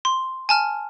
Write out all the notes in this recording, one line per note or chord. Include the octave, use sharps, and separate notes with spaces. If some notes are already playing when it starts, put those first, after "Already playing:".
C6
G#5 A5 F6